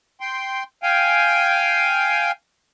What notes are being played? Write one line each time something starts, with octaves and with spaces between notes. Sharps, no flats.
G5 C6
F5 G5 G#5